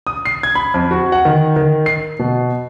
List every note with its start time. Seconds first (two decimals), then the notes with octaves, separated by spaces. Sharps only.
0.07 D#6
0.25 C7
0.43 G#6
0.55 B5
0.74 F2
0.91 F#4
1.12 F#5
1.25 D#3
1.56 D#3
1.86 C7
2.19 B2